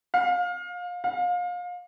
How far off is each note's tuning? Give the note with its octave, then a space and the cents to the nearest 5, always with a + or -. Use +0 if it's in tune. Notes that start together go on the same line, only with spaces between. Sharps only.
F5 +25
F5 +30